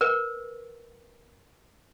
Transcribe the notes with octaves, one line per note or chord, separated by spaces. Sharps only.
A#4 B4